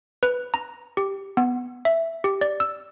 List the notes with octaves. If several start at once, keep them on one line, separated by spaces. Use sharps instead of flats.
B4
A#5
G4
B3
E5
G4
D5
E6